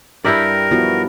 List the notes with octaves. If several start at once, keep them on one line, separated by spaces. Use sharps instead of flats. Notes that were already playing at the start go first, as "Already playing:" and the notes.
G2 G3 E4 G4 A#4 D5 E5
F3 B3 E4 F#4